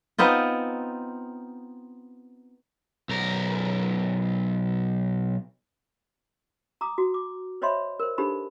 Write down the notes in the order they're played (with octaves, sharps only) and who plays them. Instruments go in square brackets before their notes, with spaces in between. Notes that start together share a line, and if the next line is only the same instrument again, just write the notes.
[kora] B3 C4 D#4 F4
[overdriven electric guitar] B1 A#4
[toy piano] A#5 D6 D#6
F#4
D6
C5 C#5 D#5 E5 B5 C6
A#4 C5
D4 D#4 G4 A4 C5 B5